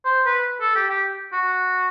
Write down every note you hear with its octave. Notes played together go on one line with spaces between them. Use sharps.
C5
B4
A4
G4
G4
F#4